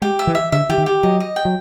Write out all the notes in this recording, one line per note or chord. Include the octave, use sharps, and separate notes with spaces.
G#3 G4
E5
E3
E5
D3 E5
E3 G4
D#3
G4
F#3 D#5
D#5
G5
F#3